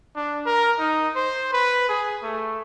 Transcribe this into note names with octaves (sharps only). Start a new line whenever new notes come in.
D4
A#4
D#4
C5
B4
G#4
A3